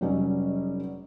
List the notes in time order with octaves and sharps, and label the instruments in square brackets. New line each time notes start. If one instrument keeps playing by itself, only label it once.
[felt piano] F1 F#3 G3 C#4 D#5